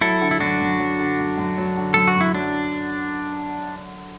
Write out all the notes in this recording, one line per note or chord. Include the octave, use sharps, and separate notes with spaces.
F#3 E4 A4
D3
E4
F#2 D4 F#4
F#2
F#3
D3
F#2
F#2
F#3
D3
F#2 A4
F#4
F#2 E4
F#3 D4